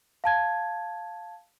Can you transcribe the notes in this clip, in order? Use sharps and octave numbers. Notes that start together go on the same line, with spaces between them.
F5 A5 G#6